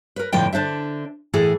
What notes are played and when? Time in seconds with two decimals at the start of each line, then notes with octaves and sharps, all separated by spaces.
0.16 A#4 B4
0.32 F2 A2 D3 F3 B4 G5
0.53 D3 D4 C5 E5
1.34 A2 E3 G#4 A4